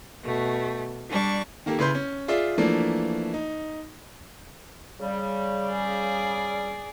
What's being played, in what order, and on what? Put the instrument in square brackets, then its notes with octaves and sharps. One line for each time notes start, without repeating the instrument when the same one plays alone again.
[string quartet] B2 A3
G3 D4 C#6
[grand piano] D#3 A#3 G4 A4
C#3 E4 B4 C6 G6
C#4
F4 G#4 D5 E5
E3 F3 A3 A#3 D4
D#4
[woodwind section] C#3 G3
[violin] G#4 D5